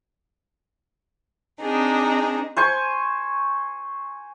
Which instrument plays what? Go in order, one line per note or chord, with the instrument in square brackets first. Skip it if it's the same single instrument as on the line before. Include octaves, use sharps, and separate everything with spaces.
[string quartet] C4 D4 D#4 G#4
[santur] C5 G#5 C#6